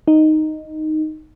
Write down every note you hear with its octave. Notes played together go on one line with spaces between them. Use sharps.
D#4